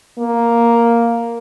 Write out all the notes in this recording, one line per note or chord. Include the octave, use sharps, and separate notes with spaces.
A#3